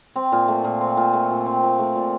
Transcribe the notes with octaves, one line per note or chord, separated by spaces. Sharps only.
C4
A#2
A3
A#2
C4
A#2
A3
A#2
C4
A#2
A3
A#2